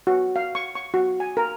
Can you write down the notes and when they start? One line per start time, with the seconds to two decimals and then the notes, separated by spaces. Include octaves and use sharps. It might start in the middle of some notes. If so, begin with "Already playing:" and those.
0.07 F#4
0.36 F5
0.55 C#6
0.75 C#6
0.94 F#4
1.20 G#5
1.37 A#4